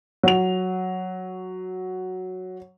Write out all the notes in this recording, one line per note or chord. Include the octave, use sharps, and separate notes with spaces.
F#3 F7